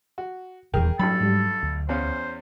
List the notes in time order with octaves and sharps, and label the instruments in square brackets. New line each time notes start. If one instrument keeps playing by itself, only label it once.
[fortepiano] F#4
[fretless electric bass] D#1 E2 [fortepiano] G#4 A#4 [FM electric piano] G5
[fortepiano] A1 G2 B5 [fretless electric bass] F#3 [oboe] A4
[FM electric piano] G#2 G3
D2
[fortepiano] E2 C#4 F5 [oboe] C5